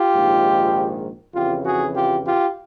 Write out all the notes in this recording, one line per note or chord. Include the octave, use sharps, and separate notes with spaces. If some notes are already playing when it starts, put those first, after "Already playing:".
Already playing: F4 G4
A#1 G#2 D#3
F2 C#3 E3 F4 G4
F#4 G#4
F4 G4
F4 G4